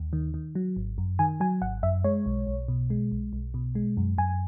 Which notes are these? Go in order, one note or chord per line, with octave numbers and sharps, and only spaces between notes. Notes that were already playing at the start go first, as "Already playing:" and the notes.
Already playing: D#2
D#3
D#3
F#3
G#1
F#2
D#3 G#5
F#3 G#5
G#1 F#5
F#2 E5
G#3 C#5
B1
B1
B2
G#3
B1
B1
B2
G#3
F#2
F#2 G#5